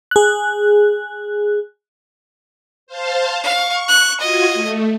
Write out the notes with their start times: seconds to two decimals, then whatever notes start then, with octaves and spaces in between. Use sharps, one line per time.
0.11 G#4 F#6
2.87 C5 F5 A5
3.44 F5 C#6
3.88 F#6
4.20 F4 F#4 D#5 G#6
4.53 A3